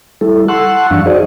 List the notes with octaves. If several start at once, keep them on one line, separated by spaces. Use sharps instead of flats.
G3 E4 A4
F#5 A5 C6 C#6 E6 F#6
F#2 E3 G3 D4 F5 C#6
D#4 F#4 G#4 C5 D5 D#5